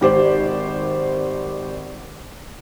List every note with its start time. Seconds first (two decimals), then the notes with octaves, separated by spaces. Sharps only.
0.01 G#1 G4 C5 D5